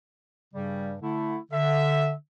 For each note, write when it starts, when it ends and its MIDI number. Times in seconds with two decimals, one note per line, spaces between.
0.54 0.95 43
0.54 0.95 49
0.54 0.95 55
1.01 1.37 50
1.01 1.37 57
1.01 1.37 64
1.51 2.13 50
1.51 2.12 76